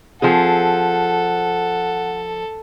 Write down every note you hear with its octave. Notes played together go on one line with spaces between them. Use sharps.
F3 C4 G#4 A4 F#5